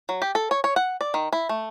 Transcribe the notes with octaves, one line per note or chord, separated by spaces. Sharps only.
F#3
G4
A4
C#5
C#5
F#5
D5
D#3
E4
A3